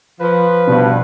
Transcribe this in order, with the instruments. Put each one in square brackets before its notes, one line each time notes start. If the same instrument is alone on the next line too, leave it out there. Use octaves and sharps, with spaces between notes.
[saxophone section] F3 [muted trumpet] B4
[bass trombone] G2 [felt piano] B2